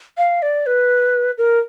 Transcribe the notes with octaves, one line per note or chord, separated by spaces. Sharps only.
F5
D5
B4
A#4